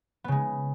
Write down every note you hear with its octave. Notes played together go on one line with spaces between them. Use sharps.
C#3 G#3 B3